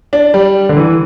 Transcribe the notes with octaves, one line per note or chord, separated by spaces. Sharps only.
D4
G3
D3
E3